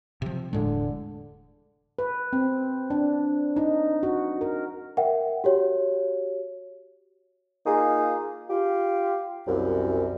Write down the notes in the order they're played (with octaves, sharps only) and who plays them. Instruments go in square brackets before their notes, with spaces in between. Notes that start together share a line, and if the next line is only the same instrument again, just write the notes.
[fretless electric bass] C3 F3
[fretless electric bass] E1 A2 G#3 [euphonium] D3
[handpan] B4
C4
D4
D#4
F#4
A#4
[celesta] A#4 E5 F#5 G5
F#4 G4 C#5
[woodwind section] A#3 D#4 F4 G#4
F4 G4
C2 F#2